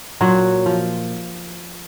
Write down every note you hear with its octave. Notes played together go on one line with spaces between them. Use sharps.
A#2 F#3 F#4
F3